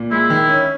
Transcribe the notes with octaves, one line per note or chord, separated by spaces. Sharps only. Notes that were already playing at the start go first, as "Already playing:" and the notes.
Already playing: A#2
G#3 E4
D#3
C#4